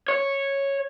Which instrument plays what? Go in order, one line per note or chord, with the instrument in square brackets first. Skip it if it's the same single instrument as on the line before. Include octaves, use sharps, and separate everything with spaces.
[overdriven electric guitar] C#5